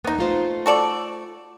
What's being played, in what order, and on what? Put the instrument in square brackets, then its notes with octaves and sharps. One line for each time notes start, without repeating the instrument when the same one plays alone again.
[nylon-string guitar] E2 A#3 [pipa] B3 D#4
[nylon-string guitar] A3 F4 C5
[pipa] F#4 A4 D5